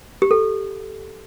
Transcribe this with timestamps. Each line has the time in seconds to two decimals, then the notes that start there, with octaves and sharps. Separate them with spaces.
0.22 G4
0.31 A4